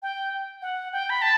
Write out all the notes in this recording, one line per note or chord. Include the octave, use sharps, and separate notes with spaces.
G5
F#5
G5
B5
A5